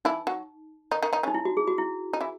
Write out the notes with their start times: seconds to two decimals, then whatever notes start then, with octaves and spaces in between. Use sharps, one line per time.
0.05 E3 D#4 E4
0.27 F#3 F#4
0.91 D#3 D#4
1.02 D#3 D#4
1.13 D#3 D#4
1.23 C#3 C#4 D#4
1.34 E4
1.45 F#4
1.57 G#4
1.67 F#4
1.78 E4
2.13 D#4
2.21 E3 E4